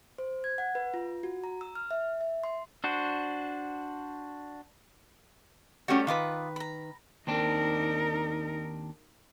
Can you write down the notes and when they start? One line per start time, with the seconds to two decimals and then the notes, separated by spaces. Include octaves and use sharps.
0.18 C5
0.44 G#6
0.58 F#5
0.75 B4
0.94 F4
1.23 F#4
1.44 A#5
1.61 E6
1.75 F6
1.91 E5
2.21 E5
2.44 C6
2.84 D4 F#4 C5
5.88 G3 A3 C#4 F#4 G4
6.07 D#3 F4 B4 D6 D#6
6.56 A#5 B5
7.27 D#2 C4 D4 D#4 A#4